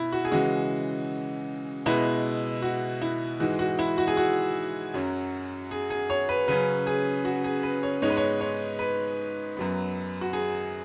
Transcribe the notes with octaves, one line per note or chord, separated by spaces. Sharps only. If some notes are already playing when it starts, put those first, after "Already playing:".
Already playing: B2 E4
F#4
G#4
C#3 E3 G#3 F#4
B2 G#3 B3 E4
F#4
E4
G#2 E3 G#3 F#4
F#4
E4
F#4
G#4
F#4
F#2 F#3 C#4
G#4
G#4
C#5
B4
C#3 F#3 C#4 B4
G#4
F#4
G#4
B4
C#5
G#2 G#3 B3 C#5
B4
C#5
C#5
B4
F#2 F#3 B3
F#4
G#4